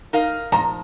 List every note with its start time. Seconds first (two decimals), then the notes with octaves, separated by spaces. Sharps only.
0.13 D#4 A#4 F5
0.52 F3 A#5